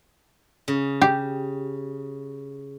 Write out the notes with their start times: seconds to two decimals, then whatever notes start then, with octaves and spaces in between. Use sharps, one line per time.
0.68 C#3
1.01 G4